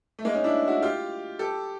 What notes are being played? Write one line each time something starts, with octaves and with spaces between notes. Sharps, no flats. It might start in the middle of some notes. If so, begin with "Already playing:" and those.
A3
G#3 A#3
C#4 D#4
D4 E4
E4 F#4
F4 G4
G4 A4